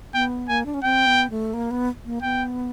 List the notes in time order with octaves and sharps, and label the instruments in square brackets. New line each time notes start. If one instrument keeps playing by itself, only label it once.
[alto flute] B3 [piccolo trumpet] G5
[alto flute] A#3 [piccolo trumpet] G#5
[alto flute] D4
C#4
[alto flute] C4 [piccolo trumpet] G5
[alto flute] B3
A3
A#3
B3
A#3
[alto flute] B3 [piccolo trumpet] G5